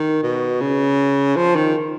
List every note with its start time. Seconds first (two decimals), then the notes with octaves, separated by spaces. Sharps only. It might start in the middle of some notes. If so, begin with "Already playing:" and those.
Already playing: D#3
0.23 B2
0.61 C#3
1.36 F3
1.55 D#3